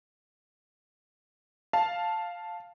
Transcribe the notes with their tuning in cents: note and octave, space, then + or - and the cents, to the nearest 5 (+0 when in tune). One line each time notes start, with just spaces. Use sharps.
F5 +0 A5 +0